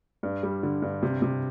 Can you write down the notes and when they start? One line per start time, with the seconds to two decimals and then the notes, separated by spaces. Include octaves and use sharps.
0.23 G2
0.43 G3
0.63 D3
0.82 G2
1.03 C3
1.22 C3